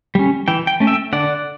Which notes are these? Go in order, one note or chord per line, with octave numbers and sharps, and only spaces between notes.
G3 C#4
E3 G5
G5
A3 C#4
E5 G5
D3 D5 F#5